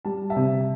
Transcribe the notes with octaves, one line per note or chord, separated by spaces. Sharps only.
G3 A5
E5 A5
C3